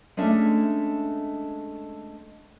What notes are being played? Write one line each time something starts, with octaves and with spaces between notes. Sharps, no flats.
G#3 A3 C#4 D4 E5